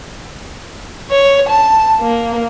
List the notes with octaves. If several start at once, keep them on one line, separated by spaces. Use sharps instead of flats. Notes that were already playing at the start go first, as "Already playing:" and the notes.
C#5
A5
A#3